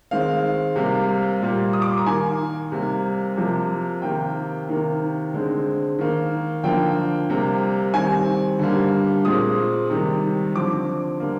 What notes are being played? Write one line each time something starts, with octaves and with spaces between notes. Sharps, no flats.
D#3 G#3 C4 F5
C3 G3 A#3
A#2 G3 A#3
D#6
D6
C6
A#5
D#3 A#3 G#5
C3 G3 A#3
C3 F3 A#3
C3 D#3 A#3 G5
C3 D#3 A#3
D3 G#3 C4
D#3 A#3
D3 F3 A#3 G5
C3 G3 A#3
D#3 G3 C4 G#5
D3 G3 A#3
A#2 G#3 C4 D#6
C3 D#3 G3
D3 F3 C4 D6
D3 G3 A#3